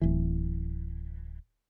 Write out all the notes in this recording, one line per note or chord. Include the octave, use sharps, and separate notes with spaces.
D1 E3